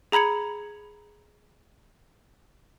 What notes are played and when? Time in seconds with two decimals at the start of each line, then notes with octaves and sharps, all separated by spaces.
0.12 G#4 A#5 B5 G#6 C#7